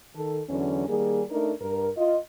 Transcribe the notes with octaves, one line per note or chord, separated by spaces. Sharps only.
D#3 A4
E2 D3 F#3 C#4
D#3 G3 A#3 G#4
A3 D4 D#4 A#4
G2 A#4
F4 D#5